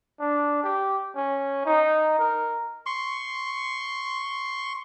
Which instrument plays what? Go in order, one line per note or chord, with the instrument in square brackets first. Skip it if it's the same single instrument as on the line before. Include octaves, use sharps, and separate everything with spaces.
[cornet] D4
G4
C#4
D#4
A#4
[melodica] C6 C#6